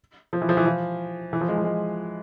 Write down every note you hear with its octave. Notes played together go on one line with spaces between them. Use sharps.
F3
E3
F3
E3
F3
E3
F3
G#3
F3
G#3